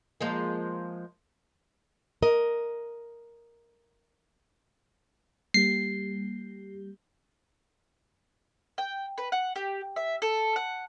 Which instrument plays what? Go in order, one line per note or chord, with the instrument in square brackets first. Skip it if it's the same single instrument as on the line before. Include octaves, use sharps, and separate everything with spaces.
[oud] F3 G#3 A#3
[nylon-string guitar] A#4 D#5
[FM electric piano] G3 A#3 G4 [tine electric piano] C7
[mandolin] G5
B4
F#5
G4
E5
A4
F#5